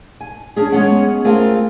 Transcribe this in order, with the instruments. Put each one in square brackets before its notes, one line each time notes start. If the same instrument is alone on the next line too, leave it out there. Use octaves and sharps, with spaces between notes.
[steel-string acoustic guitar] G#5
C#4 D4 G#4
G#3 B3 C#4 G#4 C#5 F#5
A3 C4 F4 G#4 A#4 F5